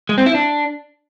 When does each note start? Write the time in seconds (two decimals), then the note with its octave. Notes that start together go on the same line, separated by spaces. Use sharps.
0.09 G#3
0.18 C4
0.26 E4
0.35 D4